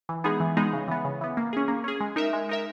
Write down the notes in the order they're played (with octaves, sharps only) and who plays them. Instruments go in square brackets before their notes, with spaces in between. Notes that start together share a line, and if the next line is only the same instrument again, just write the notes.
[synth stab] E3
G#3 B3 D#4 G#4
E3
G#3 B3 D#4 G#4
C#3
E3 B3
C#3
E3 B3
A#3
C#4 G#4
A#3
C#4 G#4
G#3
D#4 A#4 E5
G#3
D#4 A#4 E5